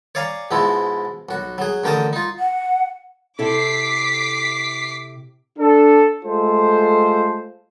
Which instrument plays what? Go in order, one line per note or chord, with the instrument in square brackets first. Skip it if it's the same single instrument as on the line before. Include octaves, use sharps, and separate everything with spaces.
[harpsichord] C#5 D5 F5 G#5 A#5
G#2 B2 F3 G#3 E4
B1 F#4
F#3 G#4
A1 D3 A#4 G5 A5 D#6
D#4 F4
[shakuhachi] F#5
[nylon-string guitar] C3 E4 A4 [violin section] D6 B6 C7
[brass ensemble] D4 A4
G#3 A3 F4 A4 C5